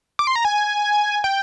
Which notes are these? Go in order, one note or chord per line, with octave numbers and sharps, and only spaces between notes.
D6
C6
A#5
G#5
G5